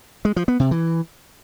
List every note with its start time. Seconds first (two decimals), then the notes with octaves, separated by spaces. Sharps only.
0.25 G#3
0.36 F3
0.48 B3
0.60 C3
0.71 E3